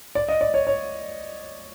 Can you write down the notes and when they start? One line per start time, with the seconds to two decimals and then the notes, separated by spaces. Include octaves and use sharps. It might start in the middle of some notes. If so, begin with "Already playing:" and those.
0.15 D5
0.29 D#5
0.41 D5
0.54 C#5
0.67 C#5